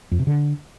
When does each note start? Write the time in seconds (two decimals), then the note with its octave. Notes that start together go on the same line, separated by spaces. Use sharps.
0.12 F2
0.19 C3
0.27 D3